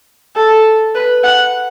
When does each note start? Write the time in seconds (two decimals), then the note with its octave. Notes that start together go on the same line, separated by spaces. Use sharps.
0.36 A4
0.95 B4
1.24 F#5